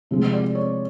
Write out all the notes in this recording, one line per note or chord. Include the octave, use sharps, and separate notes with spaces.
C3 F3 G#3
D5
C#5